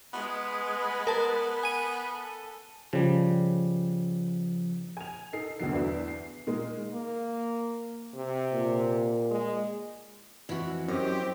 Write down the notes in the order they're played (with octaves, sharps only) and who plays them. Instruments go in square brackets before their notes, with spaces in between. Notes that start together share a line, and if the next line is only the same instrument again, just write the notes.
[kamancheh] G#3 B4 [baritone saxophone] B3
[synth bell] A#4 A5
G#5 D#7
[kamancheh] A4
[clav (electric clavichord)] C#3 G3 [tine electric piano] F3
[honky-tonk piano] G#5 F7
D#4 A4 C7
D2 B2 D3 F#3 C7
E2 B3 D4 E4
C7
A#2 D#3 G#3
[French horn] A#3
C3
[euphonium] A#2
[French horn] G#3
[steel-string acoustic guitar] F2 E3 [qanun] E4 F#4
[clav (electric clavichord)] F#2 [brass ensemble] C4 G4 [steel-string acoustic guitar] D#5